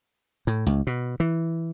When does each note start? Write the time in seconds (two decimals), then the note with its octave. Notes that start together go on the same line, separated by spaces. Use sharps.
0.47 A2
0.66 C#2
0.87 B2
1.20 E3